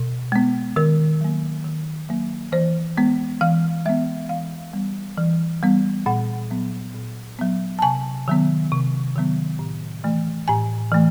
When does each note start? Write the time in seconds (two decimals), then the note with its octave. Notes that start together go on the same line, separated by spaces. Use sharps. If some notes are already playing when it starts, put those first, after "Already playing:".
Already playing: B2
0.32 G#3 B3
0.76 D#3 A#4
1.21 F#3 A#3
1.64 D#3
2.09 F#3 A#3
2.52 E3 C5
2.98 G#3 B3
3.41 E3 F5
3.86 G#3 B3 E5
4.29 E3 F5
4.73 G3 B3
5.18 E3
5.63 G3 B3
6.06 A#2 F#5
6.51 F#3 B3
6.95 A#2
7.39 F#3 B3
7.79 A5
7.82 C3 G#5
8.28 D#3 F#3 B3
8.71 C3
9.16 D#3 F#3 B3
9.59 A2
10.04 E3 A3
10.48 A2 G#5
10.92 E3 A3